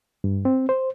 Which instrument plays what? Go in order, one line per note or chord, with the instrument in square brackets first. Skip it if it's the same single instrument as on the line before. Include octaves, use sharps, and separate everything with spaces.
[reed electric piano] G2
C4
C5